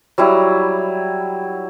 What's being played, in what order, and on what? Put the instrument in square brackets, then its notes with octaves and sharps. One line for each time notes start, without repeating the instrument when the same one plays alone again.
[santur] F#3 G3 E4